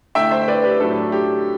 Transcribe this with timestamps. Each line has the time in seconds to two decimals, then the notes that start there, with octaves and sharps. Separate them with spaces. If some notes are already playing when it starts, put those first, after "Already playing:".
0.15 D3 A3 E4 E5 G5
0.31 C5 E5
0.48 B4 D5
0.64 G4 B4
0.80 A2 F#3 A3 D4 A4
1.12 G4